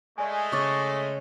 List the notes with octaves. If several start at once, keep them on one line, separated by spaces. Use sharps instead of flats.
G#3 A3 D5 G#5
C#3 C#5 C#6 D6 A6